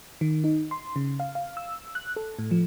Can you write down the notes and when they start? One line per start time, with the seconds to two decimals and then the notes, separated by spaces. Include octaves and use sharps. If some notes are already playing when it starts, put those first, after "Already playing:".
0.21 D#3
0.44 D#4
0.71 C6
0.96 C#3
1.20 F5
1.35 F5
1.57 E6
1.95 F#6
2.16 A4
2.39 A2
2.51 F3